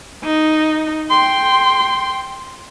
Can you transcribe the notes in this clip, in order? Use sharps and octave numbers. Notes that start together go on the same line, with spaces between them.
D#4
G5 C6